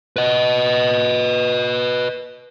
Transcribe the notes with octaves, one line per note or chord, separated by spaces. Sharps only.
B4 D#5